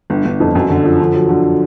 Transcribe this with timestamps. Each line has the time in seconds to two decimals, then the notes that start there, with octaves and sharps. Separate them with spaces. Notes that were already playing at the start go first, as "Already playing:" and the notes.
0.10 G1
0.25 G1
0.40 F2
0.55 F#2
0.70 D3
0.84 F3
1.00 D3
1.15 F#3
1.29 D3